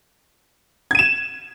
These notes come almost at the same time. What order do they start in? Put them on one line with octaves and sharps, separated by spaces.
G#6 D#7 E7